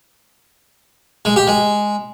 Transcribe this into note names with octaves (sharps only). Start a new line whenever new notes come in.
G#3
G4
G#3